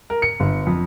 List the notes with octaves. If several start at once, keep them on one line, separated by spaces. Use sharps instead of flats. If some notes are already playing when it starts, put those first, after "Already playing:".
A#4
C#7
G1
F2